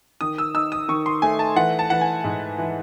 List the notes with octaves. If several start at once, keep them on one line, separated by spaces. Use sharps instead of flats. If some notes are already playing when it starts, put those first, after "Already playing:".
D#3 D#6
E6
D#4 E6
D#6
D#3 C#6
C6
A3 G#5
A5
E3 F#5
A5
E3 F#5
G#5
G#2
E3